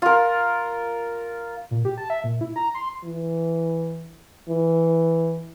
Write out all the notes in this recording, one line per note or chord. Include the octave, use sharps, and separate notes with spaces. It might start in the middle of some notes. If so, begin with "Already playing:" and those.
F4 A#4
A#2
G4
A5
E5
A#2
E4
A#5
C6
E3
E3